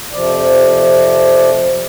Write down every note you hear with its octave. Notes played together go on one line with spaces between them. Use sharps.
F2 C3 F3 D5